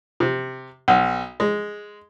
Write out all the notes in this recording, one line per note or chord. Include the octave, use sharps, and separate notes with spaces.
C3
B1
G#3